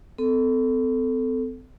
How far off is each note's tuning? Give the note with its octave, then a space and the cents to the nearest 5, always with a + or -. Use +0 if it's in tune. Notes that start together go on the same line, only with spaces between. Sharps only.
C4 -40 A4 +0